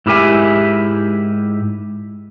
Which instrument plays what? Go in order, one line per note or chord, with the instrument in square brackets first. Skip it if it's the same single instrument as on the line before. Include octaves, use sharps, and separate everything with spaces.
[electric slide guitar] G#2 E4 G4 A#4 E5 G#5